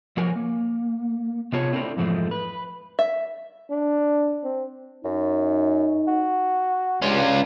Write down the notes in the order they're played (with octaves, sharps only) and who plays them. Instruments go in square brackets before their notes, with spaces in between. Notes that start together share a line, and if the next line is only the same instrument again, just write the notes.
[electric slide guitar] F3 F#3 F#4 A#4 G#5
A#3
C3 B3 F4 G#4 C#5 A5
A3 C4 D4 E4 A#4
F2 G#2 E3 F3 G#3 A3
B4
[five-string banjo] E5
[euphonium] D4
C4
[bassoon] F#2 [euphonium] D#4
[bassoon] F#4
[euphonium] C#2 [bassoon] G2 [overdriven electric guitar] C#4 F4